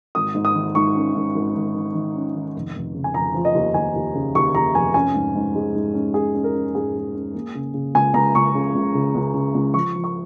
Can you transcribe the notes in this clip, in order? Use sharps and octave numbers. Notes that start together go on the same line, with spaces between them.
G#1 D#6
G#2
D#6
D#3
G#2 C#6
C#4
G#2
G#1
G#1
D#3
D#3
C#4
D#3
F1
F1
C#3
G#5
F1 A#5
F3
D#5
D#2
D#2 G#5
D#2
C#3
D#2 C#6
D#2 A#5
F1 G#5
C#4 G#5
G#2
G#2
G#3
G#2
C#4
C#4 G#4
C#4
A#4
C#4
G#2 G#4
G#3
C#4
A#3
C#3
C#3
C#2 G#5
C#2 A#5
C#2 C#6
C#3
C#2
C#3
C#2
C#3
C#2
F3 C#6
F3
C#6